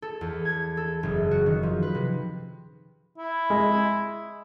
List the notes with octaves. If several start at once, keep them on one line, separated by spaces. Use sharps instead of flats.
A4
E2
G#6
A4
F#1
F#4
D#3
F3
B4
C3
E4
G#3